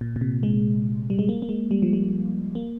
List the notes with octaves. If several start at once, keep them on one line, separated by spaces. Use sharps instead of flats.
A#2
A#2
C3
G#3
G3
G#3
A#3
A#3
G#3
G3
F3
G3
A#3